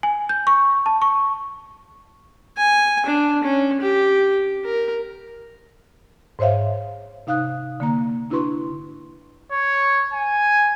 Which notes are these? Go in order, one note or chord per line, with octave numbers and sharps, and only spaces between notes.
G#5
G6
C#6
A5
C#6
G#5
D4
C#4
G4
A#4
G#2 C5 C#5 E5 F5
C3 D#4 F5 D#6 F#6
D3 A#3 A#5
D4 E4 F#4 B4 C6 C#6
C#5
G#5